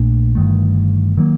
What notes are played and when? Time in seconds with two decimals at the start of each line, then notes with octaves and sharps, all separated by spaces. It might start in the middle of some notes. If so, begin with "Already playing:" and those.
Already playing: A#1 A#2 A3 D4
0.35 G1 G2 D#3 A3
1.17 D#3 F#3 A#3